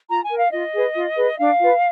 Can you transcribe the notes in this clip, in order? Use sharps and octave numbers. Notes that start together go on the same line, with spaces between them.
F4 A#5
G#5
A#4
F5
F4 D#5
G#4 B4
F4
G#4 B4
D4 F5
F4 B4